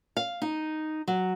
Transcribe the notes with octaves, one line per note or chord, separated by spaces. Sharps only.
F5
D#4
F#3